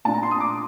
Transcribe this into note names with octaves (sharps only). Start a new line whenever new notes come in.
A#2 A3 D4 F4 A5
A#5
C6
D#6
D6